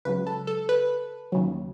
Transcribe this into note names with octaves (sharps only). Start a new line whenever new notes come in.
C#2 C#3 F#3 B4
A4
A4
B4
D#2 C#3 F#3